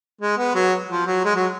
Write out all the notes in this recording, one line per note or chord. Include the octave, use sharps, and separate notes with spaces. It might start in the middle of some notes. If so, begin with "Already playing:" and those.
G#3
B3
F#3
F3
F#3
G#3
F#3